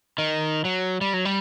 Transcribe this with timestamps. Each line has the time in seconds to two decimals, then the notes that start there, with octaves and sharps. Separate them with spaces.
0.18 D#3
0.65 F#3
1.01 G3
1.14 F#3
1.25 G3